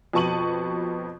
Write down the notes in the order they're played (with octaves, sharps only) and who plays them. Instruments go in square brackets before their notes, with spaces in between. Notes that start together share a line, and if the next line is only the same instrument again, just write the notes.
[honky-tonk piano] F2 B2 A5 C#6 D#7 F#7